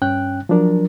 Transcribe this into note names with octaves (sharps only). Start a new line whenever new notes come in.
G2 C#4 G5 F#6
F3 F#3 D4 A#4